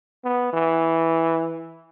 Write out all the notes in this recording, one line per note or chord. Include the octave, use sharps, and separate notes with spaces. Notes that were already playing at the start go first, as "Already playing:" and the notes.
B3
E3